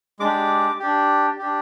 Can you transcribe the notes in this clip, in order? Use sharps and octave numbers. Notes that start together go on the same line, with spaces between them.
G#3 D4 G4 D6
D4 G4
D4 G4